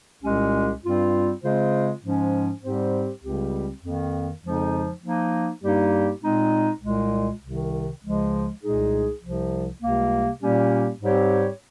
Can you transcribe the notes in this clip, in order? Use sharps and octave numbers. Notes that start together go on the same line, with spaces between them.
C2 A#2 G#3 C#4 G4
G2 G3 C4 F4
C#3 G#3 C4 F4 C5
G#2 F3 G#3 C#4
G#2 G3 C4 G4 C5
C#2 C#3 G3 C4 G4
F2 D#3 A#3
F2 C#3 F3 G#3 D#4
F3 A#3 D#4
G2 G3 A#3 D#4 G4
A#2 G#3 C4 D#4
C2 A#2 G#3
C2 C3 D#3
C#2 C#3 F3 G#3
C2 A#2 G#3 D#4 G#4
C2 C3 F3
C#2 C3 G3 A#3
A#2 G3 A#3 C#4 G4
G#2 G3 C4 G4 C#5